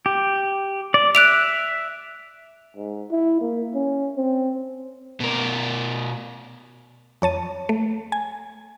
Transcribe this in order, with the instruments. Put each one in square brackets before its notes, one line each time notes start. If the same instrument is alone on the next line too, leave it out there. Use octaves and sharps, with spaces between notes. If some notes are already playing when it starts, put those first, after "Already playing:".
[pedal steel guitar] G4
D5
[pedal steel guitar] E5 [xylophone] F#6 D7 F7
[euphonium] G#2
E4
A#3
C#4
C4
[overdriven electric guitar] B2 A#4
[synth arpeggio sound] F2 C#5 A5 D#7
A3
G#5